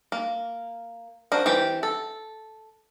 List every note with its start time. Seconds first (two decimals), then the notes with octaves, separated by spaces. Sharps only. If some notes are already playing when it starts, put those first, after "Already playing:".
0.12 A#3
1.32 D4 F#4 A#4 C5
1.46 E3 C4 G4
1.83 A4